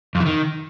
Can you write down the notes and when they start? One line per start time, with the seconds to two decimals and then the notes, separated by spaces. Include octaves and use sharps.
0.15 F2
0.20 E3
0.26 D#3